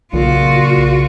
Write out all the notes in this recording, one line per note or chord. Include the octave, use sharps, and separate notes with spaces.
B1 A#2 C#3 F4 F#4